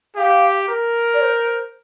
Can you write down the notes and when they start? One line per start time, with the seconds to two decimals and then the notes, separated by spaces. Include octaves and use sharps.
0.16 G4 F5
0.69 A#4
1.13 D5
1.21 C5